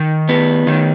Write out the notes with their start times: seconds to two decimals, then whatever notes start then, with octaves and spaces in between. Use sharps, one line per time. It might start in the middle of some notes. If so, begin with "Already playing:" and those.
Already playing: D#3
0.29 B3
0.67 D#3